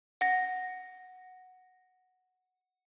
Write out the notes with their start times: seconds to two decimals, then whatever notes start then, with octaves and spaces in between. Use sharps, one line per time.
0.21 F#5 A#6